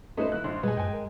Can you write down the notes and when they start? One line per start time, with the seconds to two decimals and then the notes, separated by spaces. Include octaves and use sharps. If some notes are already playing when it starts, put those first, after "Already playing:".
0.17 A3 C#4 D#4 A4 B4 C5 D#5
0.32 D#2 E4 F#6
0.44 G#1 G2 C6
0.63 A#2 G#3 G#4 B4
0.77 F#2 G5 G#5
0.93 A#4